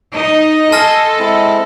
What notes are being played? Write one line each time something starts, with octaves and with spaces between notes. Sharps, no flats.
D#4 D#5
A4 G#5 A5 C6 F6 A#6
G#3 C4 E4